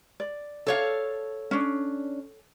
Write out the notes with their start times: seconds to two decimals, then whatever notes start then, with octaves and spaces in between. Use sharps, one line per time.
0.20 D5
0.67 A4 C#5 F5
1.51 C#4 D4